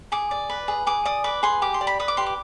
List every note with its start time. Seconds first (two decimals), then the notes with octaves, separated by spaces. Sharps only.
0.12 G#4 D6
0.31 D5
0.50 B4
0.68 G#4
0.87 G#4 D6
1.05 D5 D#6
1.24 B4 D6
1.43 G#4 C6
1.62 G4 D6
1.74 C6
1.81 D5
1.87 B5
1.99 B4 D#6
2.08 D6
2.17 G4 C6
2.26 D6